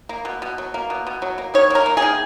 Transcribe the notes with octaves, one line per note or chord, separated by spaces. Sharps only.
A#3
B2
B2
F#3
A#3
B2
B2
F#3
A#3
D#3 C#5
A#3 A#4
A#3
G#4
D#3